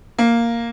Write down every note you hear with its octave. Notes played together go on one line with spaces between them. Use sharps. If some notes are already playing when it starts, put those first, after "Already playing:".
A#3